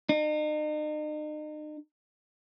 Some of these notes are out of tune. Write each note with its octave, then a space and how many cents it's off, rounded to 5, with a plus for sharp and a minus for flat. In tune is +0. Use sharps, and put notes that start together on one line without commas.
D#4 -40